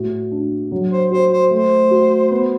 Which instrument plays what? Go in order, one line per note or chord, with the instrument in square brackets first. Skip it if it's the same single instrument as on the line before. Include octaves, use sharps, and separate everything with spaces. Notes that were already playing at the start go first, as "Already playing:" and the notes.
Already playing: [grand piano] A2 F#4
D4
F#3
[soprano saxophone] C5
[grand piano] F#4 [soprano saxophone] C5
[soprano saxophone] C5
[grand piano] A3 [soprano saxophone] C5
[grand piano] F#4
B3